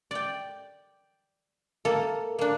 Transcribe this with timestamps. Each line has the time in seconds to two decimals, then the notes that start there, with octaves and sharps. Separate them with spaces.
0.11 D5 G5
1.85 A#3 A4
2.39 A#3 D4